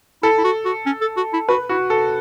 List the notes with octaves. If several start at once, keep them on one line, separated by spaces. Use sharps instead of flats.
E4 A4
E4
F#4
F#4
C#4
A4
F#4
E4
F#4 B4
E4 F#4
A4